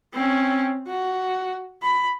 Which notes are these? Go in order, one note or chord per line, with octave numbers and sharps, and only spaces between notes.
C4 C#4
F#4
B5